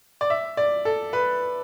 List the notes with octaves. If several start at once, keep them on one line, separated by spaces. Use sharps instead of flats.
D5
E5
D5
A4
B4